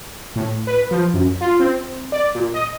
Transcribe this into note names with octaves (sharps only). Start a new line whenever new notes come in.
A2
B4
F3
F#2
F4
C4
D5
A#2
D#5